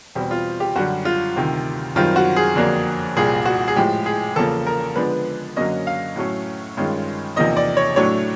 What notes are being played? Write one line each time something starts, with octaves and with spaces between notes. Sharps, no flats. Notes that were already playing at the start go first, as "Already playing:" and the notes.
E2 B2 G3 C4
F4
G4
F#2 D3 G3 F#4
F4
D2 C3 D#3
F#2 D#3 G3 C4 F4
F#4
G#4
F2 D3 F#3 A#3 D4
C2 A#2 G3 G#4
F#4
G#4
A2 F3 G#3 G4
G#4
E2 C#3 F3 A#3 A4
A#4
D3 F3 G#3 B3 D4 B4
F#2 D3 F#3 A#3 C#4 D#5
F5
A2 F#3 A3 C#4
G2 D#3 G#3 C#4 F4
E2 C3 F3 A#3 D#4 D#5
D5
C#5
A2 F#3 A3 D4 C#5